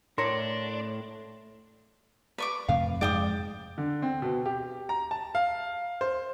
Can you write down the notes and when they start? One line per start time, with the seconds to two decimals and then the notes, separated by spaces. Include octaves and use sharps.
0.18 A2 D4 A#4 C#5 C6 A#6
2.38 B4 D5 C#6 D6
2.68 F2 C3 A3 F5
3.01 F2 G#2 D5 G5 D#6
3.78 D3
4.02 C4
4.22 B2
4.46 G4
4.89 A#5
5.11 A5
5.35 F5
6.01 C5